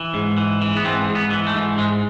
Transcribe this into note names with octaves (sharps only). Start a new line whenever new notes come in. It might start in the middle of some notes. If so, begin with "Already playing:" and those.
Already playing: E3
G#2
E3
E3
B3
G#2 C4
G#2
B3
E3
A3
G#2
G#2 G#3